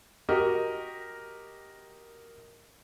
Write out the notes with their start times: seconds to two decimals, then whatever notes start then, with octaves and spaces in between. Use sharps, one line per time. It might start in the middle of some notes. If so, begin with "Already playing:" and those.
0.29 F#4 G4 A#4 D#5